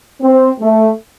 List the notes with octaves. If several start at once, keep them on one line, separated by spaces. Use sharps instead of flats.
C4
A3